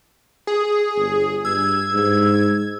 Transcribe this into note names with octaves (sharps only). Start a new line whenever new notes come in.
G#4
G1
G2 E6 G#6
G#2